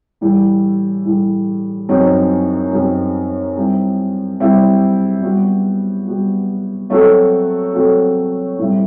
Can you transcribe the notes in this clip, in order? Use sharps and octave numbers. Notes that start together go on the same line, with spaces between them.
A2 E3 G3
A2 E3 G3
F#2 F#3 C4 D#4
F#2 F#3 C4 D#4
G3 C4 E4
G3 C4 E4
G3 B3 F#4
G3 B3 F#4
F#3 A3 C4 F#4 A4
F#3 A3 C4 F#4 A4
A2 G3 C4 E4